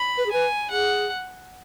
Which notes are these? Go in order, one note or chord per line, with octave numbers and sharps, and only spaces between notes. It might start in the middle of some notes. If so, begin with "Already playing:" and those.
Already playing: B5
B4
G#4
B4 G#5
G#4 F#5